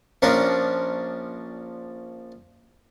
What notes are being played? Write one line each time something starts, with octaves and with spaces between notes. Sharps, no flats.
A#1 A#2 F3 C#4 D4 A#4